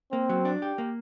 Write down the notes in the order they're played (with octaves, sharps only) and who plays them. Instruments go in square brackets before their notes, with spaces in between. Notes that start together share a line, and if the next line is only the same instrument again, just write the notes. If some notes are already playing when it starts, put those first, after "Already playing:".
[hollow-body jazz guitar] A#3 [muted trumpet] C4
[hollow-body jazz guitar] F#3
D4
G4
A#3